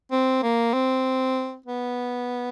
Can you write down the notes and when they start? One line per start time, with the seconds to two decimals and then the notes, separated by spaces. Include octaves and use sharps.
0.11 C4
0.43 A#3
0.73 C4
1.66 B3